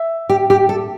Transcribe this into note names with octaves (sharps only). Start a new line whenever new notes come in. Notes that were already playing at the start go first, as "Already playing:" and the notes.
Already playing: E5
G4
G4
A4